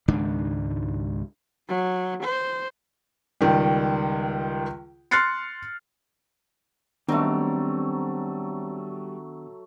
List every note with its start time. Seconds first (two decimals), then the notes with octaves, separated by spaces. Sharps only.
0.08 C#2 G#2 D#3 D4
1.69 F#3
2.24 C5
3.41 C#2 D#3 G3
5.11 C6 F6 F#6 A6 C7 C#7
7.09 D#3 F#3 G3 A3 B3 C4 D4 D#5